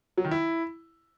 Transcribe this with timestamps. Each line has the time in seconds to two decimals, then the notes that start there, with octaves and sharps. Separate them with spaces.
0.17 F#3
0.24 D#3
0.31 E4